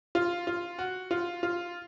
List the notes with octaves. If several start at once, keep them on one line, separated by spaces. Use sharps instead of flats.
F4
F4
F#4
F4
F4